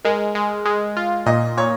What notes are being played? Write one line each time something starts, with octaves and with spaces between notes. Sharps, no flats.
G#3 A#4
G#3
G#3
F4
A#2 D#5
A#2 C#5